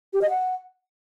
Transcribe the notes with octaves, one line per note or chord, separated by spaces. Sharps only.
G4
D#5
F#5